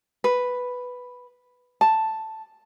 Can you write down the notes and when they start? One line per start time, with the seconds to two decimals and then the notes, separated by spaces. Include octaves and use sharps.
0.24 B4
1.81 A5